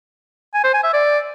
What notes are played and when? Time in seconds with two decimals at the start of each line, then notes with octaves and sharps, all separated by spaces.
0.54 G#5
0.64 C5
0.74 G#5
0.84 E5
0.93 D5